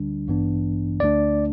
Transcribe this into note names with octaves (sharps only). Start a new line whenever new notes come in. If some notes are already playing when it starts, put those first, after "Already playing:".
Already playing: D2 D3 G3 D4
A1 G2 E3 B3 D4
D2 D3 A3 D4 D5